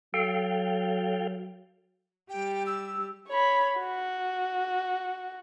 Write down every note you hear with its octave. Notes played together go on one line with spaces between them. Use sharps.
F#3 A4 F5 G5
G3 G4 G5
E6
C#5 B5
F#4